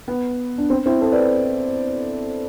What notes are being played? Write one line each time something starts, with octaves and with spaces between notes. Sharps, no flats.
B3
D4
C4
C4 E4
A4 C5
B4 D5